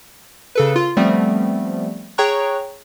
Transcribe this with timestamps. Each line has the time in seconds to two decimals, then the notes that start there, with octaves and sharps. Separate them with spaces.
0.55 C#3 A4 B4
0.76 F4
0.97 F3 G3 A3 B3 C4
2.18 G#4 C#5 G5 A#5 C#6 F#6